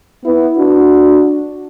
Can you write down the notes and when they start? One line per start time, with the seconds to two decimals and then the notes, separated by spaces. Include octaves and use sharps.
0.25 B3 E4
0.58 D4 F#4